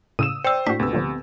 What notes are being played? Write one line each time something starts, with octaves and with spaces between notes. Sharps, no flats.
A2 C#3 D#6 E6 D#7 E7
C5 D5 G5 E6
A2 D4 F#4 B6
D2 C3 B3 E6
A#2 D3 F3